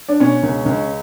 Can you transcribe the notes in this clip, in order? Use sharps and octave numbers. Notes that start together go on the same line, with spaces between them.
D4
B2 C#4
C#2
C#2